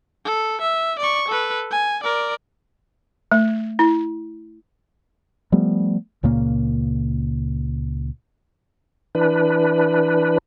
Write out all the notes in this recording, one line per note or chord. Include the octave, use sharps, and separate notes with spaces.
A4
E5
D5 C#6
A4 B4
G#5
A#4 D5
A3
E4
F3 G3 A3 B3
C#2 A#2 C#3 A#3
E3 D4 B4